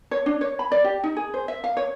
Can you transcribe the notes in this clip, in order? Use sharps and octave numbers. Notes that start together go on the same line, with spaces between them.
C#5
D4
C#5
B5
D5
G4
D#4
G#4
C5
E5
F5
C#5